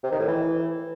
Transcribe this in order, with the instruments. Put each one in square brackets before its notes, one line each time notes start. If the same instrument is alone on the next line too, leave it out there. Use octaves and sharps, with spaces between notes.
[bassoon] C3
D#3
A2
E3